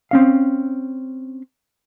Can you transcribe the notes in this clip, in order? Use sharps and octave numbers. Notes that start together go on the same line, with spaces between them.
C4 C#4 F5